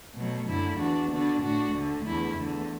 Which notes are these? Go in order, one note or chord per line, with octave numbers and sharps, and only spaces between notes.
B2 F#3 A3
F#2 D3 A3 E4
E2 E3 D4 F#4
D3 B3 D4 F#4
A2 A3 D4 F#4
D2 D3 A3
E2 D3 A3 E4
E2 D3 A3